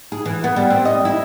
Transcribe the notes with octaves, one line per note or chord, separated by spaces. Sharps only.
G#4
E3
B3
G3
C4
D#5
E4